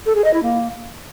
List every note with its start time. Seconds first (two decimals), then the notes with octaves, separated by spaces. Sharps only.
0.06 A4
0.15 G#4
0.24 D#5
0.34 E4
0.43 A#3